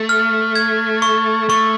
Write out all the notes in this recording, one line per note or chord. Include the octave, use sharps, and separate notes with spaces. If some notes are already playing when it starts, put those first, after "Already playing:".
Already playing: A3
F6
G#6
C#6
A3 C#6